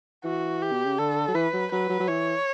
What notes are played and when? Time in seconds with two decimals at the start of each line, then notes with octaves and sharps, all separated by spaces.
0.24 E3 F#4
0.62 G4
0.72 B2
0.85 C#3
0.98 D3 A4
1.28 F#3
1.34 E3 B4
1.53 F#3
1.72 F#3 B4
1.90 F#3
2.00 F#3
2.08 E3 C#5